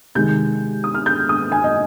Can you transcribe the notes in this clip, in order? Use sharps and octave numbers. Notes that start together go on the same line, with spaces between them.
C3 D#3 G#3 G6
D#6
F6
G6
D#6
G#5
D#5